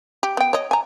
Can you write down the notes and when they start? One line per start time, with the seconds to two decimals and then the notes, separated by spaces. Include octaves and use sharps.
0.23 G4
0.37 B3 G5
0.53 C#5 D#5
0.71 G#5 A#5